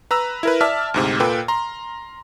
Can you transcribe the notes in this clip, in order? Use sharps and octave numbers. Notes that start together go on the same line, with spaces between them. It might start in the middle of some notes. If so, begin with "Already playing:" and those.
B4 A#5 E6
E4 A#4 B4
D5 E5 A5 F6
D2 G#2 C3
A#2 A4 B4 G5
A#5 C6